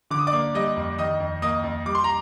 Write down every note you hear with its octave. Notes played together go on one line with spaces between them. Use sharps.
D3 D6
D#6
D5 D6
A#3
G3 D#5 D#6
F2
D#3 D#5 D#6
F2
A#3 D#5 D#6
F2
G3 D6
C6
A#5